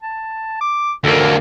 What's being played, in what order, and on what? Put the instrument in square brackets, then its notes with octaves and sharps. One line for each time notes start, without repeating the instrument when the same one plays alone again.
[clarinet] A5
D6
[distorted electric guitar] D2 A#3 [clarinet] A4